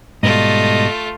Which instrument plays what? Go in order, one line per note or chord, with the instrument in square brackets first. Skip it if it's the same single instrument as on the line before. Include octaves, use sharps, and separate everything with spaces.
[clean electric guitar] G#2 B2 G3 [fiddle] A3 F4 [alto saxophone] D#5